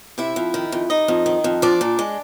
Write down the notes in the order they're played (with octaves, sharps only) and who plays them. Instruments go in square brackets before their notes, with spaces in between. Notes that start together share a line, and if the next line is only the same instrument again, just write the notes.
[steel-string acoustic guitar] C3 E4 E5
F2
D#3
F2
C3 D#4 D#5
F2
D#3
F2
F3 D4 D5
A#2
G#3